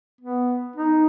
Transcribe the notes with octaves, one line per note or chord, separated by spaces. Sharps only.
B3
D#4